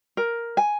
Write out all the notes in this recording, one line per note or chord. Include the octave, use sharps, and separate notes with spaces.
A#4
G#5